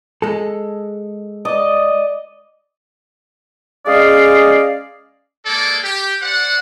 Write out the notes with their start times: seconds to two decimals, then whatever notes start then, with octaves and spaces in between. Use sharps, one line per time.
0.22 G#3 A4
1.45 D5 D#5
3.86 G#3 C#4 G#4 D5 D#5 F5
5.46 G#3 A#3 A4 D5 D6
5.84 G4
6.22 C5 D5 F#5